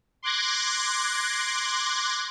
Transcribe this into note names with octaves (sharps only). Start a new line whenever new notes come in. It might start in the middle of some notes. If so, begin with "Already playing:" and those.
C6 D6 F#6 G#6 A#6